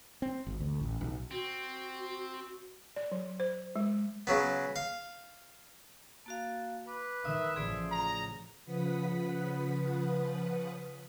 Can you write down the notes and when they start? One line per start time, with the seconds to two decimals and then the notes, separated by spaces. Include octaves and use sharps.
0.22 C4
0.47 G#1
0.60 D2
0.80 A1
1.01 B1
1.31 C4 F#4
2.96 D5
3.12 F#3
3.40 C5
3.76 G#3
4.27 C#3 F#3 B3
4.76 F5
6.26 A#3 F#4 F5 A5
6.87 B4 D6
7.25 D#3 E5 D#6
7.56 A1 C#3 F3 G#4 D5 C6 D#6
7.91 A#5
8.66 C#3 F3 B4 F#5 D#6 B6